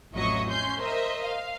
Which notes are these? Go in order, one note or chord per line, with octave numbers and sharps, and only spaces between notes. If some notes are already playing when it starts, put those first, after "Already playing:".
A1 F2 F#3 D#5 E5 C#6
C#4 C6 G6
A#4 C5 D#5 E5
F5